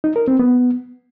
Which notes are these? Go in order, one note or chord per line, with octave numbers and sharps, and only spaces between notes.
D#4
A#4
C4
B3